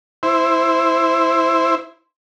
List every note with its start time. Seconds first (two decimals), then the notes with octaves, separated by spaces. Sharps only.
0.23 E4 C5